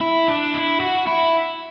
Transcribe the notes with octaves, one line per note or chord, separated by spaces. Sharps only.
E4
D4
E4
F#4
E4